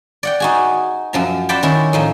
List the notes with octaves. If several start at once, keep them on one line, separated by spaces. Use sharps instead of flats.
D5 F#5 G5
D#4 F#4 G#4
F#2 F3 A#5
C5 D5 F#5 G5 A5 B5
D#3 C#4 E4
A2 F3 D#4